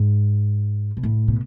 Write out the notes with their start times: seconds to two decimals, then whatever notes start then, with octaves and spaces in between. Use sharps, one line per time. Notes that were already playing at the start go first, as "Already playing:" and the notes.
Already playing: G#2
0.97 B2
1.03 A2
1.28 B2